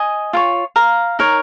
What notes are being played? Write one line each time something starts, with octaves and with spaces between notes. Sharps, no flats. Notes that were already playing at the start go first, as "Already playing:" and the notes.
Already playing: D#5 G#5
F4 A#4 C#5
F5 A#5
D#4 A#4 C#5